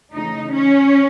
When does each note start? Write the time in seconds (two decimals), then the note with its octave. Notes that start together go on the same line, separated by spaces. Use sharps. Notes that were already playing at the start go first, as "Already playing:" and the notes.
0.14 C#3 E3 A3 D#4
0.54 C#4